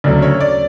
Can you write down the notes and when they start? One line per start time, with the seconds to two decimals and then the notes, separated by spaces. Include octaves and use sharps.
0.04 D2 C#3 F#3 A3 D5
0.22 C#5
0.40 D5